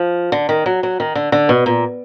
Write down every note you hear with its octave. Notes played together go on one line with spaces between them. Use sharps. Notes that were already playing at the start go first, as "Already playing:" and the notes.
Already playing: F3
D3
D#3
F#3
F#3
D#3
D3
D3
B2
A#2